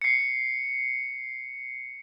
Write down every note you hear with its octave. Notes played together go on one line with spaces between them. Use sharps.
C7 C#7